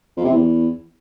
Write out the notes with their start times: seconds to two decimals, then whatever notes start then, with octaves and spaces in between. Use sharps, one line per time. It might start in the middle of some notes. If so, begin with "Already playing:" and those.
0.17 F2
0.25 C3
0.32 E2